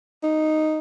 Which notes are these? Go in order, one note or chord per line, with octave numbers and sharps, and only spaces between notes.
D#4